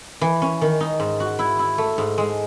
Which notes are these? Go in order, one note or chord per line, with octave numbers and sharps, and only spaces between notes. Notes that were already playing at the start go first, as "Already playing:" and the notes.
E3
C#4
D#3
D#4
G#2
F#4
E4
E4
A3
G#2
G#3